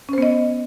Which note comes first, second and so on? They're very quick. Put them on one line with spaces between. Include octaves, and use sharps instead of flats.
C#4 C5 B3 D#5